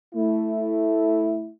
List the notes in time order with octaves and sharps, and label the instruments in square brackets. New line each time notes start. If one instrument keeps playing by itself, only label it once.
[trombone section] A3 E4